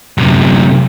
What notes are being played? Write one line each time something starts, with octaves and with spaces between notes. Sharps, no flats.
F#2 C3